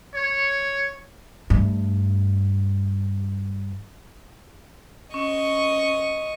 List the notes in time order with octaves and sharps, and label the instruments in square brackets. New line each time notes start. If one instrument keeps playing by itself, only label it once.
[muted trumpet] C#5
[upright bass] G2 A3
[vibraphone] C#4 [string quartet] D#5 C#6